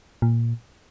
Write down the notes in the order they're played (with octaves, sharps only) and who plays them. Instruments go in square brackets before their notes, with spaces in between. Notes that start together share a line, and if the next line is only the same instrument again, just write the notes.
[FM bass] A#2